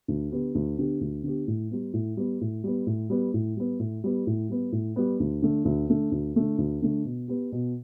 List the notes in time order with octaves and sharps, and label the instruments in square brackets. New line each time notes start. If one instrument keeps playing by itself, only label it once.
[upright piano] D2
D3 B3 G4
D2
D3 B3 G4
D2
D3 B3 G4
A2
G3 B3
A2
G3 B3
A2
G3 B3
A2
G3 B3
A2
G3 B3
A2
G3 B3
A2
G3 B3
A2
G3 B3
D2
D3 A3
D2
D3 A3
D2
D3 A3
D2
D3 A3
B2
B3 G4
B2